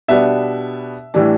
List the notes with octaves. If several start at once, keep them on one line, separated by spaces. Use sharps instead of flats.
B2 G3 B3 D4 E5
A2 E3 G3 D4